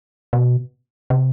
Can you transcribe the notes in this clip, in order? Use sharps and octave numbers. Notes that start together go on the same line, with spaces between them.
B2
C3